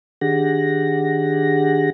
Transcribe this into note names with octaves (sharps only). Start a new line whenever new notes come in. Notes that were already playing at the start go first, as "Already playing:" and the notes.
D#3 D4 G4 G#4 F#5 A#6